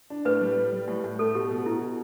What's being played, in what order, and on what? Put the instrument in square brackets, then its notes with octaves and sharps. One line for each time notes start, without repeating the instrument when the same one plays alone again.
[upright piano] D4
[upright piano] A2 [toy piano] B4
[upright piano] G3
G3
G3
A2
A2
[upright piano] A3 [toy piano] A4
[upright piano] B2 [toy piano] G4
[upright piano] B2
[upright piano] B2 [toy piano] E4
[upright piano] B2